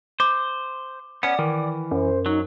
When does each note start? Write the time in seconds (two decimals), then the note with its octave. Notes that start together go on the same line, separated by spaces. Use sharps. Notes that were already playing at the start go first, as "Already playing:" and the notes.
0.20 C5 D6
1.23 B3 C#4 D5 F#5
1.39 D#3 E3
1.91 F#2 C5
2.26 F#3 D#4